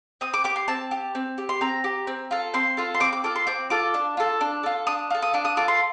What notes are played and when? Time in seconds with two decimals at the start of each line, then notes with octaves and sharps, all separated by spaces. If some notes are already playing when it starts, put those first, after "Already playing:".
0.21 C4 D#6
0.34 D6
0.44 G4 D6
0.56 C6
0.68 C4 A5
0.91 G4
1.15 C4
1.38 G4
1.49 C6
1.61 C4 A#5
1.84 G4
2.07 C4
2.31 F4 A4
2.54 C4 C6
2.77 F4 A4
2.94 C6
3.00 C4 D6
3.13 D6
3.24 F4 A4 D6
3.36 C6
3.47 C4 D6
3.70 F4 A4 D6
3.94 D4
4.17 F4 A4
4.41 D4
4.63 F4 A4
4.87 D4 D#6
5.10 F4 A4
5.22 D#6
5.34 D4 D6
5.45 D#6
5.57 F4 A4 D6
5.68 C6